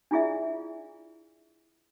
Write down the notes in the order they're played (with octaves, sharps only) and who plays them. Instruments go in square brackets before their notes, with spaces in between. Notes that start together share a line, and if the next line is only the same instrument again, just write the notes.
[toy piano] D4 E4 F4 G#4 D5 E5